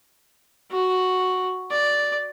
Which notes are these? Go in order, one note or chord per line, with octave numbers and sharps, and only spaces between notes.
F#4
D5